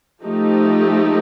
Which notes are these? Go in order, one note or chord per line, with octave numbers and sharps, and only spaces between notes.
F3 A3 D#4 G4